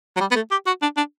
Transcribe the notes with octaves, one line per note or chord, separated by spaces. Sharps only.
F#3
G3
B3
A3
G4
F#4
D4
D4